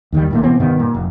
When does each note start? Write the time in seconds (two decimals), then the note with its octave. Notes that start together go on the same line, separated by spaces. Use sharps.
0.12 D#2 D#3 G3
0.31 D#1 A#2 A3
0.43 C3 E3 B3 C4
0.60 G2 C3 D#3 B3
0.79 A#2
0.94 F1